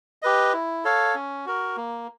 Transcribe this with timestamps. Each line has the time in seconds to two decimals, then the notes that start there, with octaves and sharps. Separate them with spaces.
0.22 G4 B4 D#5
0.53 E4
0.85 A4 C#5 F5
1.15 C#4
1.46 F#4 A#4
1.77 A#3